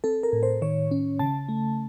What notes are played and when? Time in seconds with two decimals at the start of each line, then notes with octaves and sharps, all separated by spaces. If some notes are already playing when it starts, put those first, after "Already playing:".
0.04 C4 A4
0.23 A#4
0.33 A2
0.43 C5
0.62 D#3 C#5
0.91 C#4
1.19 C#3 A5
1.49 A3